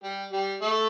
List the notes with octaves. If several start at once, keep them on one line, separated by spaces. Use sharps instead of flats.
G3 G4
G3 G4
A3 A4